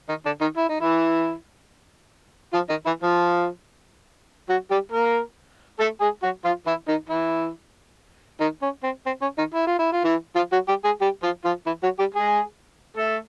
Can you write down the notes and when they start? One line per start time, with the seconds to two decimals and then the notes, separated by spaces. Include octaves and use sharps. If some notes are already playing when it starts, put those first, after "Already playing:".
0.09 D#3 D#4
0.25 D3 D4
0.41 D#3 D#4
0.57 E4
0.69 D#4
0.81 E3 E4
2.53 F3 F4
2.69 D#3 D#4
2.85 E3 E4
3.02 F3 F4
4.49 F#3 F#4
4.71 G3 G4
4.92 A#3 A#4
5.79 A3 A4
6.01 G#3 G#4
6.23 F#3 F#4
6.44 F3 F4
6.66 E3 E4
6.88 D#3 D#4
7.09 E3 E4
8.40 D#3 D#4
8.62 C#4
8.83 C4
9.06 C4
9.22 C#4
9.38 D#3 D#4
9.54 E4
9.67 F4
9.79 E4
9.92 F4
10.04 E3 E4
10.36 F3 F4
10.52 F#3 F#4
10.68 G3 G4
10.84 G#3 G#4
11.01 G3 G4
11.23 F3 F4
11.44 F3 F4
11.66 E3 E4
11.83 F#3 F#4
11.99 G3 G4
12.15 G#3 G#4
12.97 A3 A4